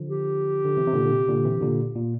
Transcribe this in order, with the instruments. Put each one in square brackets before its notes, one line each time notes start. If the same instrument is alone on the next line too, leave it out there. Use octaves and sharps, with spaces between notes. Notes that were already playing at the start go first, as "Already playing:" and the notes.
Already playing: [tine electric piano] D3 F3
[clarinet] G4
[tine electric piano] D3
C3 E3
C3
A#2 D3
D3
C3
A#2 D3
C3 E3
A#2 D3
A#2